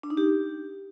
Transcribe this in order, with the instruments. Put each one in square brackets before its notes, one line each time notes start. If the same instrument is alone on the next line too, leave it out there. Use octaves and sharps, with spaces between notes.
[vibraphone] D4
D#4
G4